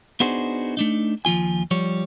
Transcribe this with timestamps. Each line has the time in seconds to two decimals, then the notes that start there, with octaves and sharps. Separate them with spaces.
0.20 B3 D4 D#4 F#4 G#4 C5
0.77 A3 D4 D#4
1.25 D#2 F3 A#3 F4 G#5
1.71 F3 G3 C#5